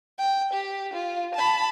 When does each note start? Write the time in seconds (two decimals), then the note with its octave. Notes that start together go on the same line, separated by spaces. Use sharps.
0.19 G5
0.53 G4
0.93 F4
1.35 A5 B5